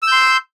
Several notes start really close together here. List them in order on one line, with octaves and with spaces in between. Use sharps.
E6 G6 C6